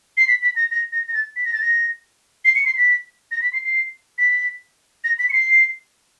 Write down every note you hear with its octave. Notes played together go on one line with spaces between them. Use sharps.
C7
B6
B6
A#6
A#6
A#6
A#6
A6
B6
A#6
A6
A#6
C7
C#7
C7
B6
A#6
B6
C7
C7
B6
A#6
B6
C#7
C7